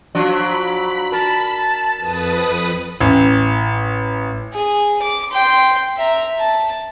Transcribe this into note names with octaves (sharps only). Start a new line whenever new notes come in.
F3 F#3 D4 B5
A#4 A5
F2 B4 D#6
A1
G#4
D6
G5 C6
E5 A#5
A5